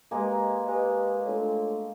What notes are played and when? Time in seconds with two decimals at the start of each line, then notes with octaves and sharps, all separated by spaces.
0.11 G#3 A#3 G4 B4 D#5 G#5
0.68 G4 B4 D#5 G#5
1.26 A3 D4 F4 A4 C#5